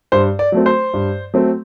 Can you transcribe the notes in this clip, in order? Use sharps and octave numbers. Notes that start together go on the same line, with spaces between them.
G2 C5
D5
F#3 A3 C4
C5
G2
F#3 A3 C4